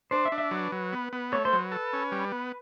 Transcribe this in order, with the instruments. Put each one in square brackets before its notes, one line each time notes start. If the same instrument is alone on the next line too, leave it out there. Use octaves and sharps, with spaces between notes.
[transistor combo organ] D4 [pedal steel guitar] C5
[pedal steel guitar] E5
[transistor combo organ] D4
[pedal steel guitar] E5
[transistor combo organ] F#3 [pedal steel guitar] B4
[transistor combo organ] F#3
B3
B3
[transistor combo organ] A3 [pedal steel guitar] C#5
[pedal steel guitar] C5
[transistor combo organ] F#3
[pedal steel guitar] B4
[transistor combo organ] A4
C#4
G3
B3